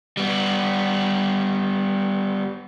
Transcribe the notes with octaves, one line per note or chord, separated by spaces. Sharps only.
G3 B3